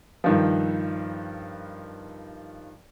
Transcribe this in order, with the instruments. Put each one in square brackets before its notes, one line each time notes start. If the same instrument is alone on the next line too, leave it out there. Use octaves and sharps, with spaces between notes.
[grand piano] G2 D#3 F3